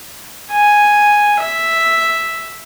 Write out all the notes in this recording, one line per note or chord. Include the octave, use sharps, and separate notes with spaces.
G#5
E5